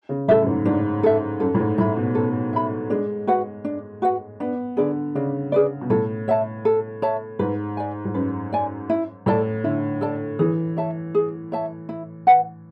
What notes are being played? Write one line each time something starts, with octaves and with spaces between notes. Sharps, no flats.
C#3
A2 A4 E5
F#2
G#2
G#2 D4
A4 E5
F#2 A4
A2
G#2
A2 E5 B5
B2
B2 A4
E5 B5
G#3 D4
F#4 B4 F#5
D4
F#4 B4 F#5
B3 D4
D3 G#4 B4 D5
C#3 D4
G#4 B4 D5
B2
A2 A4
C#5 E5 A5
A4
C#5 E5 A5
G#2 B4
D5 G#5
G#2
F#2 B4
D5 G#5
E4
A2 A4 D5 A5
D3 E4
A4 D5 A5
E3 G#4
C#5 E5 A5
G#4
C#5 E5 A5
E4
B4 F#5